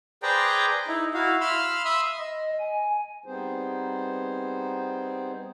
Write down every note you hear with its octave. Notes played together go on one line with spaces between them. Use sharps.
G#4 B4 C5 D5 G5 A#5
D#4 E4
E4 F#4 F5
F5 B5 C6 E6 F6
E5 B5 C6 D#6 E6
D#5
G#5
G3 B3 C4 D#4 G#4 C5